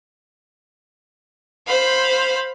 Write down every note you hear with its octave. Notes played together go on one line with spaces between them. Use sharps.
C5 F5 B5